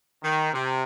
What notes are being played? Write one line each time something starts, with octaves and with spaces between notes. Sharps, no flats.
D#3
C3